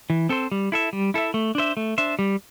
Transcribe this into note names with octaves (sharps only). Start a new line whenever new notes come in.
E3
C4 A4 C5
G3
E4 A4 E5
G3
E4 A4 E5
A3
D4 C5 E5
A3
D4 C5 E5
G3